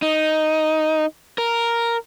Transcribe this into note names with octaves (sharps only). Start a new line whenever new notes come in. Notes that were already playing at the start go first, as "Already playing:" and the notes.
D#4
A#4